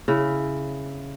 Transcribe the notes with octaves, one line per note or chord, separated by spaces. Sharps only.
C#3 E4